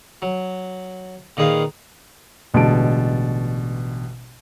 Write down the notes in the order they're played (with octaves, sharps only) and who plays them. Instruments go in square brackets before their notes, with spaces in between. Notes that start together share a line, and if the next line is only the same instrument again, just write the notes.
[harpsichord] F#3
A#2 D#3 G#4 B4 F5
[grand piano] A1 B2 D3 G#3 A5 D7